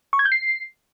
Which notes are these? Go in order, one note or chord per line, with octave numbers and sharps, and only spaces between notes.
C#6
G#6
G6
C7